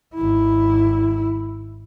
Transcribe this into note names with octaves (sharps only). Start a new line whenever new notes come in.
G#1 E4